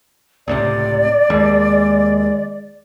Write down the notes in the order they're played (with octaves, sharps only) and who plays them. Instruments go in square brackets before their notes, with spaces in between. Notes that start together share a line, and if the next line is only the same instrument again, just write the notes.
[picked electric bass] C#2 A2 C3 [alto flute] D5
[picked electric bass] D#2 [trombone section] G#3